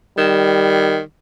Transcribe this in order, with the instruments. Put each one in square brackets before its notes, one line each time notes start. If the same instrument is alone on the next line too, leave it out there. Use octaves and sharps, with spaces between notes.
[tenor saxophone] D#3 [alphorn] G3